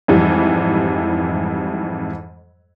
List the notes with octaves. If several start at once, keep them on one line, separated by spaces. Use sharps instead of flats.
F2 G#2 E3 G3